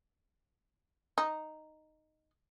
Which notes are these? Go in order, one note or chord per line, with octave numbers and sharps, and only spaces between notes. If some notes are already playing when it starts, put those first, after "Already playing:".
D#4